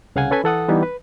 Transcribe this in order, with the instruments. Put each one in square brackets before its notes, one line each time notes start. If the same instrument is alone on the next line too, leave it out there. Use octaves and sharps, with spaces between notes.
[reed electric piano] C2 C#3 F5 F#5 G#5
C#4 A4 B4 G#5 B5
E3 A4 F#5 D#6
E3 G3 B3 D#4
B4